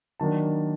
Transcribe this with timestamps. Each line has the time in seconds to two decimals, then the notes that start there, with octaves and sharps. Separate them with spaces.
0.20 D#3 F#3 A#3 D4 A5